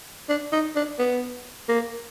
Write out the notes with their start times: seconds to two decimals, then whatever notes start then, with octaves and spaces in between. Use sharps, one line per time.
0.29 D4
0.52 D#4
0.76 D4
0.99 B3
1.69 A#3